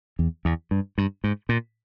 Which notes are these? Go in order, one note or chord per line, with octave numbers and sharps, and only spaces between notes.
E2
E2
G2
G2
G#2
A#2